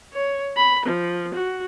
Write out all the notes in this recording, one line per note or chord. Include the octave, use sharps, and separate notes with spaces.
C#5
B5
F3
F#4